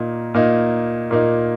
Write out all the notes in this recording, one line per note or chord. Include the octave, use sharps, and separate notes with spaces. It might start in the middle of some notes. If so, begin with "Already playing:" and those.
Already playing: A#2 A#3 D#4
A#2 A#3 D#4
A#2 A#3 D#4